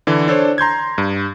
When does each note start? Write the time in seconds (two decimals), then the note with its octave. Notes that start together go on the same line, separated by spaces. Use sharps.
0.07 D3 E3
0.28 D4 A4 C5 C#5
0.58 A#5 C6 G6 G#6
0.98 G2